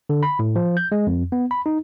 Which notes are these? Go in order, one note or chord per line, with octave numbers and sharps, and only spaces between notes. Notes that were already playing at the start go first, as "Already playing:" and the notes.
D3
B5
A2
F3
G6
G#3
F2
B3
B5
D#4